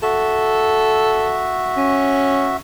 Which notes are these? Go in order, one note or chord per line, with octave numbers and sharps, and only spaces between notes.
F#4 A4 E5
C#4